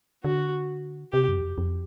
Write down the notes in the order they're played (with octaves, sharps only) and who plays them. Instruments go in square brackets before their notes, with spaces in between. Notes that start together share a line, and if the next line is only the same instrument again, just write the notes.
[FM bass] D3 [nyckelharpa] F#4
[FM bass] C3 [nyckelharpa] G4
[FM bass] F#2
E2
F2
F2